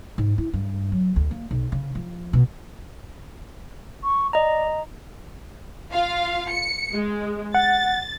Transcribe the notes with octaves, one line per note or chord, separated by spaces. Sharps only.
G#2
E4
G2
F#3
D2
A#3
B1
C#3
F3
B2
C#6
D5 D#5 A#5
F4 F5
C#7
G#3
F#5 A6